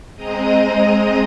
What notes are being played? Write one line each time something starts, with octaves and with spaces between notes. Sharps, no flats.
G#3 C4 D#5 A#5 D#6